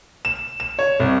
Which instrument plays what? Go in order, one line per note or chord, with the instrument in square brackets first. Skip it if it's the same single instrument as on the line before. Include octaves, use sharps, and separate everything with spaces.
[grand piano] E7
E7
C#5
C2